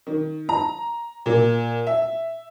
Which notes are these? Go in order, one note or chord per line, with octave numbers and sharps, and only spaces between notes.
D#3
A#5
A#2
E5